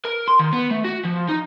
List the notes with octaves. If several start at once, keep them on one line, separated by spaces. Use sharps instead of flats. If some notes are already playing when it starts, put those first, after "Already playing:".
A#4
C6
D#3
B3
A3
F#4
F3
D#4